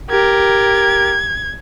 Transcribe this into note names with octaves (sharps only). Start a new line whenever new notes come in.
G4 A#4 G#6